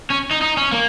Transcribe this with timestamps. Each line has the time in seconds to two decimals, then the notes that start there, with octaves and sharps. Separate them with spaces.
0.10 C#4
0.31 D#4
0.42 D#4
0.57 C#4
0.72 A#3